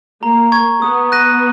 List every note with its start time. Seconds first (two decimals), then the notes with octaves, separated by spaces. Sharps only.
0.23 A#3 A#5
0.52 C#6 G#6
0.82 B3 D#6
1.12 F#6 A#6 D#7